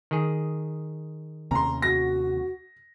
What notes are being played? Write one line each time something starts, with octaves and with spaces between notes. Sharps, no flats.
D#3 G#4
D#2 C3 C#4 A#5 C6
F#4 A#6